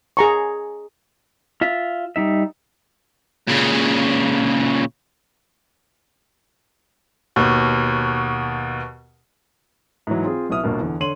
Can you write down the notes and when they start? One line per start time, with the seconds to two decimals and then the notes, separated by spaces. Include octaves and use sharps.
0.17 G#4 A#5 C#6
1.61 F4 E5
2.16 G3 D#4 E5
3.48 A#2 C#3
7.36 D#2 B2
10.07 G#2 E3 F#3
10.24 C4 F4 G#4
10.49 B1 B2 E4 D#6 F6
10.63 G1 G2 B2 A#3
10.81 E2 D3
11.00 D3 C#5 C6 D#7 F#7